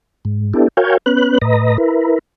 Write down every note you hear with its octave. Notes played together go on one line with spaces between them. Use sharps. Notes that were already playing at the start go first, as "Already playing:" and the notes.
G#2
B3 D4 E4 G4 A4
F#4 A#4 C#5 F5 G5 G#5
B3 C#4 B4 F#6
A2 B4 D#5 A#5
E4 A#4 B4